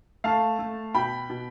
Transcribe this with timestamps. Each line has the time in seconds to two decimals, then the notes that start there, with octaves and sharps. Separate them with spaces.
0.24 A3 F5 A5
0.59 A3
0.95 B2 G5 B5
1.30 B2